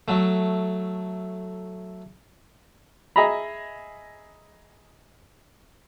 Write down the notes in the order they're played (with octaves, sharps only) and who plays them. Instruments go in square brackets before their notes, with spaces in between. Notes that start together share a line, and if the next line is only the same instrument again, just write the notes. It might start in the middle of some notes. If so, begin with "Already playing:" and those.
[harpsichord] F#3 A3
[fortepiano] G#4 D#5 E5 A#5 B5